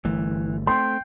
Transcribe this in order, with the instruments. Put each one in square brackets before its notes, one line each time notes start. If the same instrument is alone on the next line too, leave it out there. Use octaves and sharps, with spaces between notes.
[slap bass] G1 A3 [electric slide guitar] E3
[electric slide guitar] A3 C4 [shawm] G5 [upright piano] C6